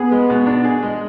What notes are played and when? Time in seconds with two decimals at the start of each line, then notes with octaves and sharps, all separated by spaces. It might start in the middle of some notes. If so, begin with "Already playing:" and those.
Already playing: B3 G#4
0.12 G#3
0.30 B2
0.46 D4
0.64 G#4
0.83 G#3